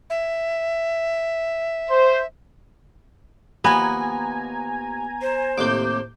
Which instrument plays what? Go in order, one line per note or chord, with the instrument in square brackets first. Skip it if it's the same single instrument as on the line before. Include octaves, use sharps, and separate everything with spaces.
[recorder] E5
[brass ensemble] C5
[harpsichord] D#2 F3 [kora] B3 [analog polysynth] G#5 A#5 G#6
[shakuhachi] C5
[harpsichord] D#2 A2 C3 [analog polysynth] D6 G6